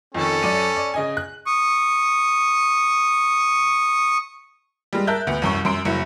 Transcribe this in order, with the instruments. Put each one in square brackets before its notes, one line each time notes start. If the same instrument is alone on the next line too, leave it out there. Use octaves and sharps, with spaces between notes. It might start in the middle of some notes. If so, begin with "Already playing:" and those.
[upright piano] F2 D#3 [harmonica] C#4 A4
[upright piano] F#2 D5 D#7
D5
C#3 D#5 G#5
F#6
[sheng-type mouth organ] C#6 D#6
[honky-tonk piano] G3 G#3
A#4 E5 A5 F#6 G6
D2 B3 C#7
C2 F#2 C#6
F#2 C6 D7
F#1 F#3 E4 C#7